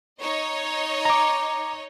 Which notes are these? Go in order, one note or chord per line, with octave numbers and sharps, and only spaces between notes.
D#4 C#5 D#5
A#5 D6